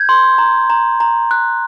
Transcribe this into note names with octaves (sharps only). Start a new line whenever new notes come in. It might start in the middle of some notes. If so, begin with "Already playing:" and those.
Already playing: G6 G#6
C6
A#5
A#5
A#5
F#6